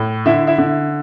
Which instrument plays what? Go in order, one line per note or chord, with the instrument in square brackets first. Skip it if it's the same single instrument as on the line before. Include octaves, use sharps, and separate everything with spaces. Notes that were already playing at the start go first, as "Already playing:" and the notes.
Already playing: [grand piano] A2
D3 E4 E5
E4 E5
D3